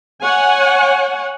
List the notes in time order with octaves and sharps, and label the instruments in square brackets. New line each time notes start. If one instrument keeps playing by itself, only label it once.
[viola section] C#5 F#5 G#5